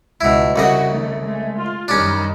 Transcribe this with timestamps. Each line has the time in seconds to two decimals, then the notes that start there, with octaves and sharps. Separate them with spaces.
0.21 C#2 B2 E4
0.56 C2 C#3 F#4 D#5
0.89 D#3 A3
1.23 G#3 A3
1.56 F4
1.88 F#2 D#3 G3 C#4 D4